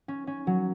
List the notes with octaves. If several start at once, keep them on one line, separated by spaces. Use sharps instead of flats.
C#4
C#4
F#3